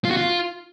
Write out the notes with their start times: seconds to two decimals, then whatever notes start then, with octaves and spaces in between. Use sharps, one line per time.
0.05 F4
0.11 F#4
0.17 F4